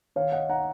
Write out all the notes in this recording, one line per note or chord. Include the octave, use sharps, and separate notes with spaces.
D#3 C#5 F5
D#5 F#5
D#4 F#5 A#5